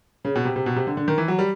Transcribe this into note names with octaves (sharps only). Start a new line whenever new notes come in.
C#3
B2
C3
C3
B2
C3
D3
D3
D#3
E3
F#3
G3